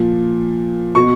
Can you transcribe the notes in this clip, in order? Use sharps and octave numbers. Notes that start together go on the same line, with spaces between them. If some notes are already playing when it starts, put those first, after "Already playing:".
Already playing: A#2 F3
B2 C#6